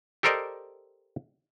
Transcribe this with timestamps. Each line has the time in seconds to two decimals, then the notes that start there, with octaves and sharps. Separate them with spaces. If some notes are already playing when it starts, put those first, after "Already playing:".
0.23 G4 A4 A#4 C5 D5 D#5